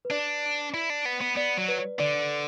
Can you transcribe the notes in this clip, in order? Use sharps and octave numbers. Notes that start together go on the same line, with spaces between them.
B4
D4 D5
E4
D4
B3
B3
B3 D5
F#3
B4
D3 D5